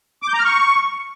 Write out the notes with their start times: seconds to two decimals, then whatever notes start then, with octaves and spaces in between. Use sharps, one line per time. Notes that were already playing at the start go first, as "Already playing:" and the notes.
0.22 D6
0.28 G6
0.34 A#5
0.39 F6
0.45 C#6